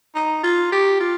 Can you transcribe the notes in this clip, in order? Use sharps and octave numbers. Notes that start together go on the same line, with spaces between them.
D#4
F4
G4
F4